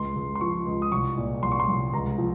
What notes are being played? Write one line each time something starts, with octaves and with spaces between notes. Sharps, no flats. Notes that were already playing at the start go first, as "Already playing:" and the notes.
Already playing: C#2 C6
C#2
C6
F3 C#6
C#2
D#6
C2 C#6
A#2
C2 C6
C#6
C6
C2
C#2 A#5
F3